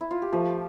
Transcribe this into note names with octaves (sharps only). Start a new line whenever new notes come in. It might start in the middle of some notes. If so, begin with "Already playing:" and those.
E4
F4
G4
F3 A3 A4